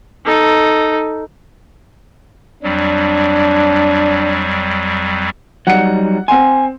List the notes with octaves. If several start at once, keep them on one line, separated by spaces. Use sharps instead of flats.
D#4 A4
F2 F#3 G3 D4
F#3 G3 D#4 F#5 C#7
C4 F#5 G#5 C6